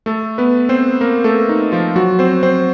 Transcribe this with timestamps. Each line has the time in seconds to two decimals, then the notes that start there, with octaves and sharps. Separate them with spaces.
0.06 A3 A4
0.38 B3 B4
0.69 C4 C5
1.01 A#3 A#4
1.24 A3 A4
1.49 D#4
1.72 F3 F4
1.96 F#3 F#4
2.19 C4 C5
2.43 C4 C5